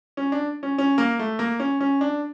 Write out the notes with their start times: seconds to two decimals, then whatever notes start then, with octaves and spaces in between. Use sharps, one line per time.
0.17 C#4
0.32 D4
0.63 C#4
0.78 C#4
0.98 A#3
1.19 A3
1.39 A#3
1.60 C#4
1.81 C#4
2.01 D4